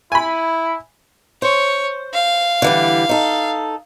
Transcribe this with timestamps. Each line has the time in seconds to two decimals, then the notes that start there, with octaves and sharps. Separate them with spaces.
0.12 E4 G#5 B5
1.42 C5 C#5
2.14 F5
2.62 D3 E3 G3
3.09 D#4 A4